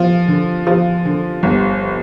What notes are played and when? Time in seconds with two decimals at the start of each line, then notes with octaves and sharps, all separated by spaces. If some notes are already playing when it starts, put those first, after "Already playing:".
Already playing: F3
0.28 D3
0.67 F3
1.05 D3
1.43 G1